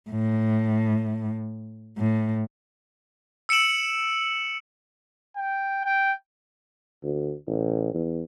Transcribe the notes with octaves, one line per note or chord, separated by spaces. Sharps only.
A2
A2
E6 C#7 D7 E7 F#7
G5
G5
D2
A1
E2